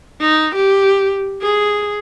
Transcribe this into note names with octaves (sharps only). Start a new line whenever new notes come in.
D#4
G4
G#4